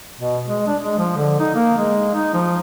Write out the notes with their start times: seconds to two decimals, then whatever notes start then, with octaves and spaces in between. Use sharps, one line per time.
0.20 B2
0.48 G#3
0.67 D4
0.82 G#3
0.98 F3
1.17 D3
1.40 D#4
1.55 A#3
1.78 G#3
2.14 D#4
2.34 F3